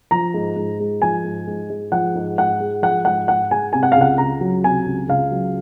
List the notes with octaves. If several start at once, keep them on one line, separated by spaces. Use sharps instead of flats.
F3 A#5
G#2
G#2
G#3
F3 G#5
G#2
G#2
G#3
F3 F#5
G#2
G#2 F#5
G#3
F3 F#5
G#2 F#5
G#2 F#5
G#3 G#5
C3 G#5
F#5
C#2 F5
F#5
C#2 A#5
F#3
C3 G#5
C#2
C#2 F5
F#3